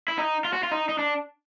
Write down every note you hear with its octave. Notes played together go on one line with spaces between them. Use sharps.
E4
D#4
F4
F#4
F4
D#4
D#4
D4